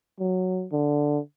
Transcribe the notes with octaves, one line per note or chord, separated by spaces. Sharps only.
F#3
D3